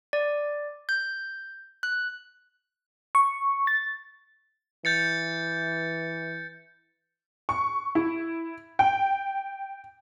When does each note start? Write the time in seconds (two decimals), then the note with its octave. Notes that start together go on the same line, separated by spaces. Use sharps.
0.13 D5
0.89 G6
1.83 F#6
3.15 C#6
3.67 A6
4.85 E3 G6 A6 C#7
7.49 C#6
7.95 E4
8.79 G5